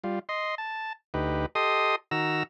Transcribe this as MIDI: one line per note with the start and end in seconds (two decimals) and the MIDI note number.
0.04 0.19 55
0.04 0.19 65
0.29 0.55 75
0.29 0.55 84
0.58 0.93 81
1.14 1.46 38
1.14 1.46 63
1.14 1.46 67
1.14 1.46 71
1.55 1.96 67
1.55 1.96 69
1.55 1.96 75
1.55 1.96 84
1.55 1.96 87
2.11 2.43 51
2.11 2.43 66
2.11 2.43 82
2.11 2.43 88